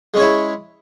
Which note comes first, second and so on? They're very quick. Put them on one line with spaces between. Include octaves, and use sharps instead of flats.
G#3 C#4 C#5 E4